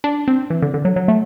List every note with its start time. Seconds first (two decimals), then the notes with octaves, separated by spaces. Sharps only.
0.04 D4
0.28 C4
0.50 E3
0.62 D3
0.74 D3
0.85 F#3
0.96 F#3
1.08 A3